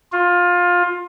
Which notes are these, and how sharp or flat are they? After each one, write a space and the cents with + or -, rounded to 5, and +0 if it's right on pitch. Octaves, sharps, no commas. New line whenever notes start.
F4 +20